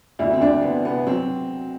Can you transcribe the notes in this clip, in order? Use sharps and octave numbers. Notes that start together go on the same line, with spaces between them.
D2 E4
C4
D2 D4
E3 B3
C3 B3
F#3 C4